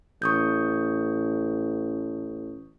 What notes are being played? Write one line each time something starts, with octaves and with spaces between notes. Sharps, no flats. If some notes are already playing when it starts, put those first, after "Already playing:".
A1 C#6 D#6 G6